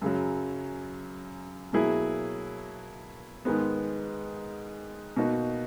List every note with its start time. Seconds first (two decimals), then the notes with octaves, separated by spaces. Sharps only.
0.02 F#2 C#3 F#3
1.73 B2 F#3 A#3 E4 G#4
3.45 G#2 D#3 G#3 B3
5.16 B2 A#3 D#4 F#4